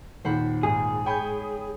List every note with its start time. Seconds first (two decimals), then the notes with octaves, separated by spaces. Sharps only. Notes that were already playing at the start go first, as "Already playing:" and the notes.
0.25 D#2 A#2 D#3 C5 F#5 B5
0.63 G#2 G#4
1.06 C#5 G5 G#5 B5 G6